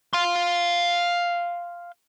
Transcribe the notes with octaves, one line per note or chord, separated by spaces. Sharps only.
F5 C6